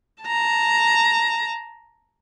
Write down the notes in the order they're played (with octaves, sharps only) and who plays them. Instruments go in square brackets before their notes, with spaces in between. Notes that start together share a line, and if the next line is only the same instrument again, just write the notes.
[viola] A5 A#5